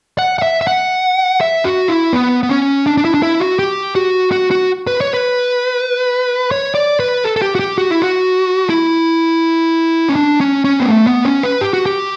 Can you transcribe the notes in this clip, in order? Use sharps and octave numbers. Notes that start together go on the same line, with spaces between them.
F#5
F#5
E5
E5
F#5
E5
F#4
E4
B3
B3
C#4
D4
D4
E4
D4
E4
F#4
G4
F#4
F#4
F#4
B4
C#5
B4
C#5
D5
B4
A4
A4
G4
F#4
G4
F#4
E4
F#4
E4
C#4
D4
C#4
C#4
B3
A3
B3
C#4
B4
G4
F#4
G4